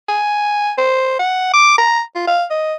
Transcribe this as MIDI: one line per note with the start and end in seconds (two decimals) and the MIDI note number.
0.08 0.71 80
0.78 1.17 72
1.19 1.52 78
1.54 1.76 86
1.78 2.02 82
2.15 2.25 65
2.27 2.44 77
2.50 2.75 75